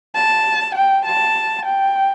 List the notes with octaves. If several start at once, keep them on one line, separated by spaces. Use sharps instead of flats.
A5
G5
A5
G5